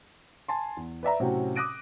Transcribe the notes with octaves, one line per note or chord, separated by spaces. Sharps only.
G#5 A5 C6
E2
B4 D5 E5 A#5
A2 C3 F#3 C4 C#4 F#4
D6 D#6 F#6 A#6 D7 D#7